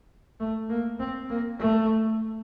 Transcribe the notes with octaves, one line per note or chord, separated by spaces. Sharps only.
A3
A#3
C4
A#3
A3